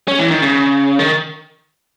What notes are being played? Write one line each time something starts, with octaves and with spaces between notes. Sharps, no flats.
C#4
E3
D#3
C#3
D#3